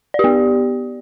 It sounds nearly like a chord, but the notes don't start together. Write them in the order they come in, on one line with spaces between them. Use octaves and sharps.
D5 G4 B3